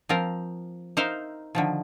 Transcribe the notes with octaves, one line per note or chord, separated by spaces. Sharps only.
F3 C4 F4 A#4
D#4 A#4 C5 E5 F5
D3 D#3 F3